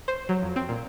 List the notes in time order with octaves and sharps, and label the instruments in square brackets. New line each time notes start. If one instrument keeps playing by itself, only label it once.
[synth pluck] C5
F#3
F2
C4
A#2